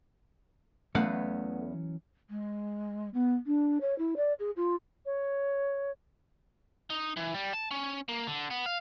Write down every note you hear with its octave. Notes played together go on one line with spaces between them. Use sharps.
E2 E3 F#3 A3 B3 C#4 F5 F#5
G#3
B3
D4
C#5
E4
D5
G#4
F4
C#5
D#4
E3
G3
A5
C#4
A#3
D3
B3
F5